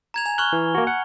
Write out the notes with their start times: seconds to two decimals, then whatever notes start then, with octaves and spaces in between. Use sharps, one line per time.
0.14 A#5 G#6 F7
0.26 G#5
0.38 C#6 F6 F#6 G7
0.53 E3
0.75 A#3 F#4
0.87 F#5